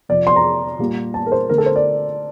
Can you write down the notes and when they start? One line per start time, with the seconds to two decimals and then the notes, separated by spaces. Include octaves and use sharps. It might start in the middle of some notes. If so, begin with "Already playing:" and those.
0.09 F2 C3 F3 D5
0.27 C6
0.36 A#5
0.79 A#2 G3 A#3
1.14 A5
1.26 A#4
1.32 C5
1.49 D3 A3 C4 A#4
1.58 A4
1.66 C5
1.76 D5